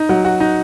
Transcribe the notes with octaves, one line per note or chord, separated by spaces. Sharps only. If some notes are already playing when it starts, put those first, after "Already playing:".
Already playing: D#4
F#3
F#4
D#4